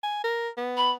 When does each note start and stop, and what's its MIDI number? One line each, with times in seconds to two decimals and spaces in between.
0.03 0.24 80
0.24 0.49 70
0.58 0.95 59
0.77 0.91 83